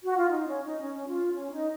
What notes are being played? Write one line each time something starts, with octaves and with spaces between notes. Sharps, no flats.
F#4
F4
D#4
C#4
D#4
C#4
F4
C#4
D#4